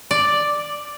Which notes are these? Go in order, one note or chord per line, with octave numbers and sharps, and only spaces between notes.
D5